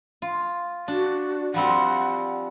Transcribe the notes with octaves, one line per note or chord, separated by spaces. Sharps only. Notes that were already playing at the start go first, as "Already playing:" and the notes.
F4
D4 F#4
F3 G3 C4 F#5